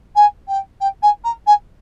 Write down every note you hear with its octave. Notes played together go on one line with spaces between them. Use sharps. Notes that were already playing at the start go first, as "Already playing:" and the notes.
G#5
G5
G5
G#5
A#5
G#5